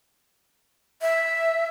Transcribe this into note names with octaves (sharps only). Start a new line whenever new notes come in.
E5